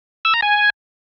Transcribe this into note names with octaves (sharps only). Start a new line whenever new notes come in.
E6
A#5
G#5